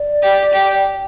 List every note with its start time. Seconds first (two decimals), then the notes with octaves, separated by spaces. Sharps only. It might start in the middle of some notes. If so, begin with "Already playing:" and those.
Already playing: D5
0.22 G4
0.53 G4